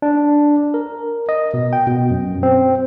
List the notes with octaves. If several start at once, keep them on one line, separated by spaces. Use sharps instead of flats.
D4
A#4
D#5
B2
G5
B2
F#2
C4